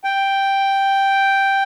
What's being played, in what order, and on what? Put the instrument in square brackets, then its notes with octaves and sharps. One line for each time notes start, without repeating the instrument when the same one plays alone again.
[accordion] G5